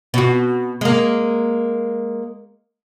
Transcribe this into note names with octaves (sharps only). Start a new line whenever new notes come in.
B2 F#4
G#3 A#3